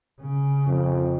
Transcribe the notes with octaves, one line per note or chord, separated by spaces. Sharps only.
C#3
F2